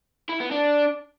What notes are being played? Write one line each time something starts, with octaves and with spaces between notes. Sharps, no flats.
E4
B3
D4